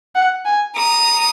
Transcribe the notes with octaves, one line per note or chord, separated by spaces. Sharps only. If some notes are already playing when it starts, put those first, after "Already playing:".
F#5
G#5
A#5 D#6